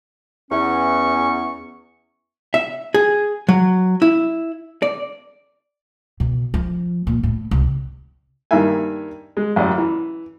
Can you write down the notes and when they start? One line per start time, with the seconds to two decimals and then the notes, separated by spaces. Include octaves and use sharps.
0.51 E2 E3 B3 C#4 C#6
2.54 E5
2.94 G#4
3.49 F#3
4.02 E4
4.82 D5
6.20 B2
6.54 F3
7.07 A#2
7.23 A2
7.51 C2
8.51 G2 D#3 A#3 E4 E5 G#5
9.37 G#3
9.56 A1 F#2 F#4 D5
9.78 E3